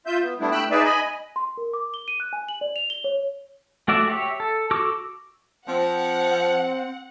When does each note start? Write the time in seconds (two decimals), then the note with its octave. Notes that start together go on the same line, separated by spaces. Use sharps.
0.06 F4 E5 G6
0.22 B3
0.40 G3 A3 B3 D4 E4
0.52 A3 G5 B5 E6 F#6
0.71 D#4 G#4 B4 D5 E5
0.84 D#5 G#5 B5
1.36 C6
1.57 A#4
1.73 D6
1.94 G7
2.08 D#7
2.20 F#6
2.33 G#5
2.48 F#7
2.61 D5
2.76 F7
2.90 G7
3.04 C#5
3.88 A3 F#4 D5 E5
4.08 G4 C#5 E5
4.40 A4
4.71 F#4 A4 C#6 D6 E6
5.68 F3 C4 F#5